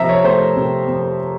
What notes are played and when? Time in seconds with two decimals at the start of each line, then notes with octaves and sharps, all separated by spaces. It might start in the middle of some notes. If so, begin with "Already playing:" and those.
Already playing: C3 F3 E5 A#5
0.09 C#5
0.24 A3 C5
0.56 C3
0.87 F2